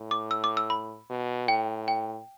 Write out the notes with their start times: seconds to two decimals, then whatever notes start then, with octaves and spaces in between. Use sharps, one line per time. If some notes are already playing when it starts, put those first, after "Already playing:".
Already playing: A2
0.11 D6
0.31 E6
0.44 D6
0.57 E6
0.70 B5
1.10 B2
1.48 A2 G5
1.88 G5